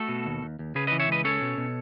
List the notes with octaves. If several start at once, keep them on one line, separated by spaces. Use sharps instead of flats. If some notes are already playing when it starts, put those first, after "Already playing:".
Already playing: A3 F#4 A4
B2
D#2
D#2
D#2
C#3 G#4 B4
B4 D#5
E3
C#5 E5
C#2 B4 D#5
C#4 A4 C#5
B2
B2